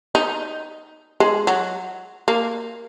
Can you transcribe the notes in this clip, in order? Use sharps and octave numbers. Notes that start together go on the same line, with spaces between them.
D#4
G#3
F#3
A#3